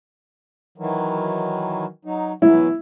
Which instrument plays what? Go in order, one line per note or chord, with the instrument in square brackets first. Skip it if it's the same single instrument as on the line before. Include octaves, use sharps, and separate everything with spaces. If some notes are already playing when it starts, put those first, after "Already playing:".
[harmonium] D#3 E3 F#3
F#3 D#4
[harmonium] B2 E3 F#3 [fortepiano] E4